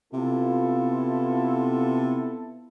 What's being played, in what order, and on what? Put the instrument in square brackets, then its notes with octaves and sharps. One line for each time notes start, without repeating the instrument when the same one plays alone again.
[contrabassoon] C3 [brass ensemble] B3 E4 A4 [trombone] F4